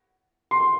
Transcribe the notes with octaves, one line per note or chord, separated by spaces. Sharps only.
C6